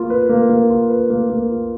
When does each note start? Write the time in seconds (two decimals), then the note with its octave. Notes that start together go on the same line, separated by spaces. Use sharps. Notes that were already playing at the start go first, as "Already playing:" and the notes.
Already playing: A#3 F4
0.10 B4
0.29 A#3
0.49 A#3
0.70 F4
0.90 B4
1.10 A#3
1.29 A#3
1.49 F4